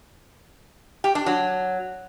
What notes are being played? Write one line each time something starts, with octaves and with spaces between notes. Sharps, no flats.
G4
D4
F#3